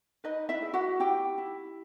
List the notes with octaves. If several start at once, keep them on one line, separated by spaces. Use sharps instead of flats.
D#4 B4 D#5
E4 E5
G#4
F#4 F#5
E4 G4 G5
E4